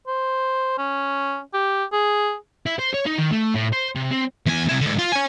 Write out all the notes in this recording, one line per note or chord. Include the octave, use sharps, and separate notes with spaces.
C5
C#4
G4
G#4
E4
C5
C#5
D#4
D#3
A3
A2
C5
C3
C4
E2 G#5
C3 E4
G#2 D3
F4
C#5 G#5